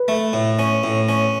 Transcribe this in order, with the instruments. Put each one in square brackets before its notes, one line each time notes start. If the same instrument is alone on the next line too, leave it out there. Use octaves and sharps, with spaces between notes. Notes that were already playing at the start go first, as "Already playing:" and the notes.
Already playing: [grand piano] B4
[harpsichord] A3
A2
C#4
A2
C#4